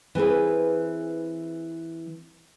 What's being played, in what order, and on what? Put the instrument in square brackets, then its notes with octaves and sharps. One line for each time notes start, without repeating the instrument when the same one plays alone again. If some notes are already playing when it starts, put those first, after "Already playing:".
[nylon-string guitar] E3 C4 G#4 B4